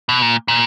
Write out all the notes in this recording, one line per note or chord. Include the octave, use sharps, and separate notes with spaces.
B2
A#2
A#2